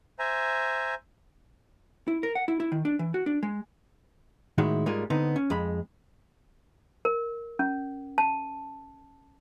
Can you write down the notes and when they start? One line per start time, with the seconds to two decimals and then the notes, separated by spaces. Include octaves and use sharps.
0.19 C5 E5 G#5 A#5
2.08 E4
2.23 A#4
2.35 F#5
2.48 E4
2.60 E4
2.72 D#3
2.85 D4
2.99 E3
3.14 F#4
3.26 D4
3.43 G#3
4.58 A2 D#3 G#3 E4 F#4
4.86 G#2 G3 G#3 A#3 F4 G#4
5.10 D3 B3 C4 D#4
5.36 C#4
5.50 F2 G#3 B5
7.05 A#4
7.59 C#4
8.18 A5